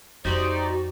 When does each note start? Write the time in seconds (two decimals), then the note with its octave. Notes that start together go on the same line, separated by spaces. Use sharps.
0.25 F2 B3 D#4 F#4 G4 C5 D5